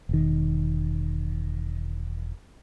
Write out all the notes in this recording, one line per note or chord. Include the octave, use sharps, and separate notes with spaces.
E1 D#3